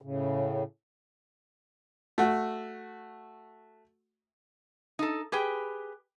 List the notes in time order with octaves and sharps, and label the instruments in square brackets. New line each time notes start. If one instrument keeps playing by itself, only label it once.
[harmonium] A2 C#3
[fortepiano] A3 F#4
[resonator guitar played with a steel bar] D#4 A4
G4 G#4 B4 G5